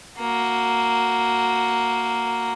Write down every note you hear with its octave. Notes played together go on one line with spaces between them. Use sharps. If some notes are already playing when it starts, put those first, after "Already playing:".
A#3 F#4